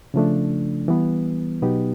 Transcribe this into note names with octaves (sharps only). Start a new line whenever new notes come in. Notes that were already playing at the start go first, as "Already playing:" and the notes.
C#3 F3 A3 D4
E3 G3 B3
B2 F#3 B3 D#4 G4